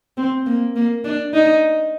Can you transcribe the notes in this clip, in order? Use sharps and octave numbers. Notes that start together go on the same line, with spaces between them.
C4
A#3
A#3
D4
D#4